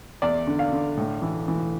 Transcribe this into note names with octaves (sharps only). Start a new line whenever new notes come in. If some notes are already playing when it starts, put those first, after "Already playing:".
E2 D5
D3
F5
D3
A2
E3
E3